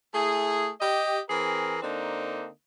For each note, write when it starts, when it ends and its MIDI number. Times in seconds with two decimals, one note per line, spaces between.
0.14 0.70 57
0.14 0.70 64
0.14 0.70 68
0.81 1.19 67
0.81 1.19 75
1.29 1.77 52
1.29 1.77 60
1.29 1.77 68
1.29 1.77 70
1.82 2.48 50
1.82 2.48 58
1.82 2.48 60
1.82 2.48 62
1.82 2.48 63